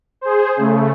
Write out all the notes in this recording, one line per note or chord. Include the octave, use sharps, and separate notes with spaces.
G#4 C5
C#3 A3